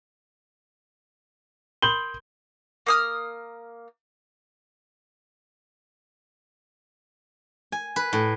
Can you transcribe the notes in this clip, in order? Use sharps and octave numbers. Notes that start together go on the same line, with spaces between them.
A#4 B5 C6 G6 F#7 G7
A#3 D#6 F6
G#5
B4
A2